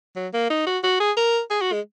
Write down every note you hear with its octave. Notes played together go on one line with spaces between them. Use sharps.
F#3
A#3
D#4
F#4
F#4
G#4
A#4
G#4
F#4
G#3